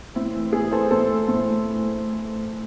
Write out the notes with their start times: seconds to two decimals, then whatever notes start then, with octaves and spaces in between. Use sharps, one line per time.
0.15 A2 C4 E4
0.35 E3
0.53 A2 E4 G#4
0.71 E3 A4 C5
0.91 A2 A4 C5
1.09 E3
1.28 A2